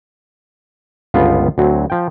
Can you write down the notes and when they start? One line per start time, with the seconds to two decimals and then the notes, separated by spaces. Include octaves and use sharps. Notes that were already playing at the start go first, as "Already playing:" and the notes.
1.14 G1 C#2 B3 F4 A5
1.58 D2 F#3 C4
1.90 F3 G5